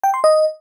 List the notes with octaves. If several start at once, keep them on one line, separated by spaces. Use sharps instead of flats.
G5
C6
D#5